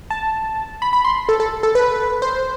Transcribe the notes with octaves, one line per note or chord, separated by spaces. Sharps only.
A5
B5
B5
C6
A4
A4
A4
B4
C5